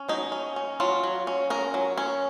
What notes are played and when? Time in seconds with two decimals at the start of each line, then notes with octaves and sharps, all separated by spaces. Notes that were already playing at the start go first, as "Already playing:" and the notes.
Already playing: C#4
0.09 F#3 D#4
0.32 C#4
0.56 C#4
0.80 F#3 F4
1.03 F#3
1.27 C#4
1.50 C#4 A#4
1.74 F#3
1.98 C#4